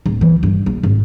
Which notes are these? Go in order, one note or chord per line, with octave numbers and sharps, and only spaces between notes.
D1
E3
G2
A#1
G#1